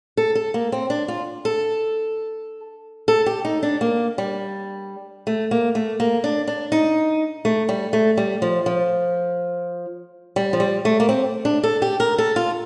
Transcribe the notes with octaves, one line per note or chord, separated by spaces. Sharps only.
A4
A4
A#3
C4
D4
F4
A4
A4
G4
D#4
D4
A#3
G3
A3
A#3
A3
A#3
D4
D4
D#4
A3
G3
A3
G3
F3
F3
G3
F3
G3
A3
A#3
C4
D4
A4
G4
A#4
A4
F4